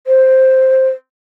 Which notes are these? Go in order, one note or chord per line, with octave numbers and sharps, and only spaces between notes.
C5